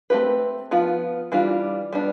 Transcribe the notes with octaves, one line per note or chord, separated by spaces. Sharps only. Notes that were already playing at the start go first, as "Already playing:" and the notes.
A3 C4 G4 B4
F3 B3 F4
E3 G3 D4 F4
G3 B3 D4